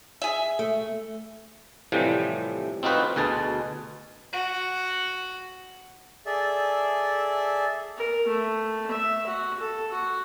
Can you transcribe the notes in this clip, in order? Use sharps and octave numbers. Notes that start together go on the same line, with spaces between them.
G#4 E5
A3
A2 C3 E3 F3 G3
C4 D#4 F4 F#4 B4 C5
D2 B2 G#4 A5
F#4
G#4 A4 D5 E5
A#4
A3
E5
F#4
A4
F#4